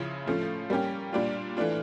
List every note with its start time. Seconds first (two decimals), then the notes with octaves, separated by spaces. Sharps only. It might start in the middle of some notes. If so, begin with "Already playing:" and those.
Already playing: C#3 F3 C#4 E4
0.26 A2 F3 A3 C#4
0.70 G3 A#3 C#4 G4
1.13 A#2 G3 D4 F4
1.57 E3 A3 D4 F4